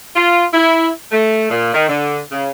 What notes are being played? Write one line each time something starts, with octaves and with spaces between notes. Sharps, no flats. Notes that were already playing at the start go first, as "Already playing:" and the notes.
F4
E4
A3
A#2
D#3
D3
C#3